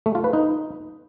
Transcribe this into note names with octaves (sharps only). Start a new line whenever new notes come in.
A3
F4
B4
D#4